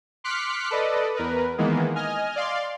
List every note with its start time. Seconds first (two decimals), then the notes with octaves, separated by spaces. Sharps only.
0.24 C6 D6 F6 F#6 B6 C#7
0.71 A4 B4 D5 D#5
1.14 E2 A#4 B4
1.58 D#3 E3 G#3 A#3 B3
1.96 D#5 G#5 F6
2.36 D5 F5 C6